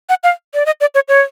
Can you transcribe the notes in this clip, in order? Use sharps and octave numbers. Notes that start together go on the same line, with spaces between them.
F#5
F5
D5
D#5
D5
C#5
C#5